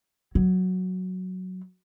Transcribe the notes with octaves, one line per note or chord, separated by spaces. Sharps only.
F#3